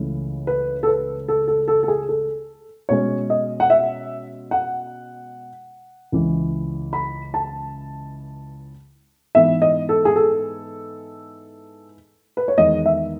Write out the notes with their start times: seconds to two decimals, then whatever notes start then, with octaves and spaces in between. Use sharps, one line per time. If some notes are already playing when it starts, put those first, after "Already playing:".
Already playing: C#2 C#3 E3 A3 C#4
0.47 B4
0.83 A4
0.87 B4
1.28 A4
1.47 A4
1.68 A4
1.83 A4
1.88 G#4
2.09 A4
2.89 B2 G#3 C#4 C#5
3.30 D#5
3.60 F#5
3.70 E5
4.51 F#5
6.12 C#2 C#3 E3
6.93 B5
7.34 A5
9.35 G#2 E3 B3 E5
9.62 D#5
9.89 A4
10.05 G#4
10.16 A4
12.37 B4
12.48 C#5
12.57 E2 D#3 G#3 D#5
12.86 E5